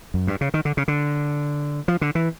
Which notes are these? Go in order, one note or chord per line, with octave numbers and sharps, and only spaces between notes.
F#2
G2
C#3
D#3
D3
C#3
D3
F3
D3
E3